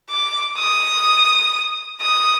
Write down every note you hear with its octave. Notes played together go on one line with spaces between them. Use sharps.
D6
D#6
D#6